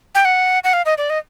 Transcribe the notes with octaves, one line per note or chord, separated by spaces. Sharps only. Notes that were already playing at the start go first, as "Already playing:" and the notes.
G5
F#5
F#5
F5
D#5
D5
D#5